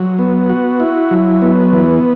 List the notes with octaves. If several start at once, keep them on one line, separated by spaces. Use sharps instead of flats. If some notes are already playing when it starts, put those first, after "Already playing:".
Already playing: F#3
B3
F#4
E4
F#3
B3
E3